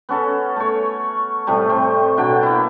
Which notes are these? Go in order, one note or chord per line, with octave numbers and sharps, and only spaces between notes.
B3 C#4 A4
A3 C#5
A2 C3 G3 A3
C4
B2 D3 F#3 G5
A#3 E4